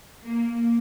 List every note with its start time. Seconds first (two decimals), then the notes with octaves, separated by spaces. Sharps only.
0.24 A#3